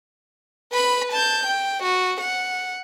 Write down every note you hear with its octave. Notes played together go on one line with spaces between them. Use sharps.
B4 B5
A5 G6
G5
F#4
F#5